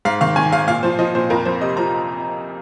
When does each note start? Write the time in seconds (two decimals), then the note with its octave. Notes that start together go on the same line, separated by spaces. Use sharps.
0.05 G#2 F5
0.21 D#3 F5
0.36 D#3 G#5
0.52 G#2 F5
0.67 A#2 F5
0.83 F3 C5
0.99 F3 D#5
1.15 A#2 C5
1.30 F2 A#4
1.45 F2 C5
1.61 C3 D#5
1.77 F3 A#5